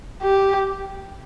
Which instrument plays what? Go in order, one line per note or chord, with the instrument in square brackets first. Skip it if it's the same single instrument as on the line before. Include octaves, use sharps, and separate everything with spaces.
[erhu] G4